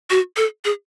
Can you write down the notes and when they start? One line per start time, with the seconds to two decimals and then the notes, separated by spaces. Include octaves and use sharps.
0.10 F#4
0.37 A4
0.65 G#4